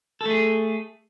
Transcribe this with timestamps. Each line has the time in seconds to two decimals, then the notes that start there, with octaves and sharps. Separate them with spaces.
0.21 A4
0.25 A3
0.30 G#4